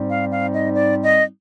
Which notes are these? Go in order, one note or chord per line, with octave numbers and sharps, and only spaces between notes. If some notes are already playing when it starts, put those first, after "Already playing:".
Already playing: G#2 G3 C4 D#4
F5
F5
D#5
D5
D#5